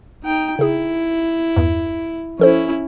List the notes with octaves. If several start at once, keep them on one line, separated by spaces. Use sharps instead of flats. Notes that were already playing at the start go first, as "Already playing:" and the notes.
D#4 G5
C#3 E4 G#4
E2 G2
F3 C#4 E4 A4 C5